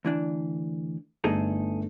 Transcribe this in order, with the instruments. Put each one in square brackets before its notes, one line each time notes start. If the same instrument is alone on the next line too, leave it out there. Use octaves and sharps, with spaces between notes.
[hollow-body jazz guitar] D2 E3 D4
[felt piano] G1 A3 [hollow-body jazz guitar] D#4 G#4 A4